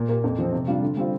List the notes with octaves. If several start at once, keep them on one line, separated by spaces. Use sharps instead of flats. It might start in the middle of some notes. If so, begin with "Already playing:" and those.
Already playing: A#2
A#3 G4
F2
F3 C4
C3
G3 D4 F4
D3
G3 C4 F4